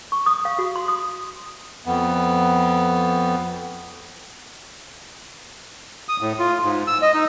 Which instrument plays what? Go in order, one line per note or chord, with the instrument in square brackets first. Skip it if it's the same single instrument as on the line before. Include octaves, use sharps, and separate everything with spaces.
[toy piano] C#6
D#6
F5
F#4
C6
D#6
[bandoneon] F2 B3
D#6
A2
F4
G#2
E6
D#5
D#4